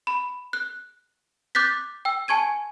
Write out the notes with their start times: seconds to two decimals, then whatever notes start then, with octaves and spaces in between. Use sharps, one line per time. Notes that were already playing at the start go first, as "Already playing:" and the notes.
0.07 B5
0.53 F#6
1.55 D6 F#6 G6 A6 B6
2.05 G5 E6
2.28 G#5 A5 C#6 G#6 D#7